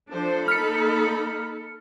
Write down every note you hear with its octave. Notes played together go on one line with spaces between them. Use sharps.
F3 D4 A4 C5
A#3 D#4 B5 F6 C#7